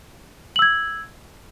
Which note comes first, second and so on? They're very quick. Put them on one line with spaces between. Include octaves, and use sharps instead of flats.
F#7 E6 G#6